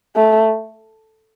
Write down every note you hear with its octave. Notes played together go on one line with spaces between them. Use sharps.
A3